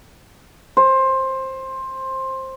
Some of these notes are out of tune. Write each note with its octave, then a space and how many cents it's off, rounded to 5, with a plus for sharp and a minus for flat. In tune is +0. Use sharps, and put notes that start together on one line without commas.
C5 +15